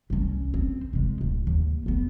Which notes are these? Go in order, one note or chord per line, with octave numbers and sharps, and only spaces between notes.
C2 C#4
C4
C3 G#3
D1
D#2
F2 B3